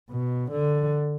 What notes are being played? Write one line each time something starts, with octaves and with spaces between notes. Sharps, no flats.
B2
D3